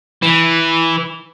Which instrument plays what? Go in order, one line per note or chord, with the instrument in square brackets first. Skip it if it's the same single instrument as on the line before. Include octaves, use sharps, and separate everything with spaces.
[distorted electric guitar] E3